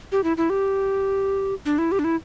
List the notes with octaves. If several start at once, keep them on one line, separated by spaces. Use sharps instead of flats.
G4
E4
E4
G4
D4
E4
G4
D4
E4